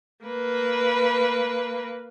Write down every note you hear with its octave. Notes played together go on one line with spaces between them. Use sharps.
A#3 B4